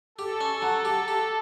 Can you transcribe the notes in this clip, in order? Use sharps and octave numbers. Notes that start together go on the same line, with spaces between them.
G4 A4
C#4
F#3
G4
G4